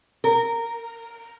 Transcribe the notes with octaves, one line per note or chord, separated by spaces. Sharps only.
A#4